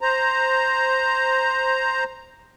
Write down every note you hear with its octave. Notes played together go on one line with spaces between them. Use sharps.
C5 A#5